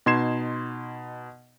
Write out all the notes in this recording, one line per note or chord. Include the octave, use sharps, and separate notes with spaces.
B2 D#4 C6 G#6 C7 E7